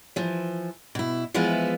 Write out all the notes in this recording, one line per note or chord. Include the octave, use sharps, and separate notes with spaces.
E3 F3
B2 E4
E3 F3 G#3 B3 E4 F4